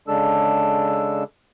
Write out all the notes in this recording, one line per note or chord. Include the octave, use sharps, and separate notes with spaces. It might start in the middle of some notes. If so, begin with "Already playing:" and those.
C#3 G#3 D4 A4 E6